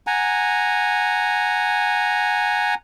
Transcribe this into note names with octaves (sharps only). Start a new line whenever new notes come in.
F#5 G#5 A#5